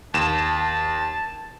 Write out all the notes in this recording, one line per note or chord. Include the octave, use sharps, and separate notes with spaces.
D#2 A5 E7